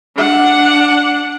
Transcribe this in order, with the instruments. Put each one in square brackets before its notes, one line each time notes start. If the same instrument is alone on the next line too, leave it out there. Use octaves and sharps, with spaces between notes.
[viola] D4 F#5